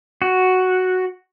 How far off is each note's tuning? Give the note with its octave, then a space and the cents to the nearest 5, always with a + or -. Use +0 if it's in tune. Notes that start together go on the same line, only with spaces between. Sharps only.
F#4 +0